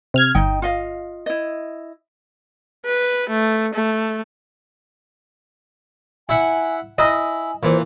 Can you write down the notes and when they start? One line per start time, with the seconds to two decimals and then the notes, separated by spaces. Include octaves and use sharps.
0.14 C3 F6 G#6
0.35 G1 D#4 D#5 G5
0.62 F4 D#5 F5
1.26 E4 D#5
2.85 B4
3.30 A3
3.74 A3
6.29 E4 E5 F#5 G#5
6.98 E4 D#5 G#5
7.63 A#2 E3 C5